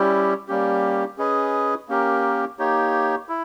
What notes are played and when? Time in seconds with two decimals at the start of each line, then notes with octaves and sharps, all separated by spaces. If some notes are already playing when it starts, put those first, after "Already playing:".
Already playing: G3 C#4 E4 G4
0.48 G3 A#3 C#4 G4
1.18 C#4 G#4 B4 D#5
1.89 A#3 C#4 G4 A#4
2.59 A#3 D#4 G4 C#5
3.29 E4